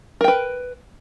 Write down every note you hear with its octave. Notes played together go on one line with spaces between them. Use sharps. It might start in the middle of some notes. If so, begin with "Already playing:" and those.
A#4 B4 G5